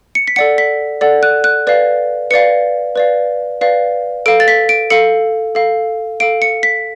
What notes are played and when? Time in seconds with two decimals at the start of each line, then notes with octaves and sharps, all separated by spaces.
0.15 C#7
0.28 B6
0.36 A4 D5 F#5 C#7
0.58 B6
1.01 A4 D5 F#5
1.23 F#6
1.44 F#6
1.67 B4 D5 F5
2.30 B4 D5 F5 C#7
2.96 B4 D5 F5
3.61 B4 D5 F5
4.26 A4 F5 D7
4.40 A6
4.48 B6
4.69 D7
4.90 A4 F5 C#7
5.55 A4 F5
6.20 A4 F5 D7
6.42 C#7
6.63 B6